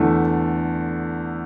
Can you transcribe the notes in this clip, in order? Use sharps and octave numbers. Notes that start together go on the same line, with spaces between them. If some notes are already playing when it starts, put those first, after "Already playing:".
Already playing: E2 D3 A3